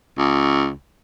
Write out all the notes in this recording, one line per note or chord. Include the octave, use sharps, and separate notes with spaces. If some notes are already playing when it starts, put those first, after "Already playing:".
C#2